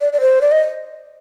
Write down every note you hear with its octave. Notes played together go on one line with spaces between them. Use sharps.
D5
D5
C5
D5
D#5